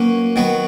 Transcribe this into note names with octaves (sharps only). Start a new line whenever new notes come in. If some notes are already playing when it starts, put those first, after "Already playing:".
Already playing: F#3 A#3 C#4 F#4 B4
D#3 F#3 B3 F#4